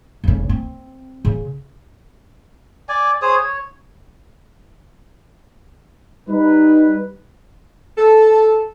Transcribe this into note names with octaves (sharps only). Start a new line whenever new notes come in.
F1 C#3
C4
C#3
D5 G#5
G#4 C5 C#5 D#6
C#5
G3 D#4 B4
A4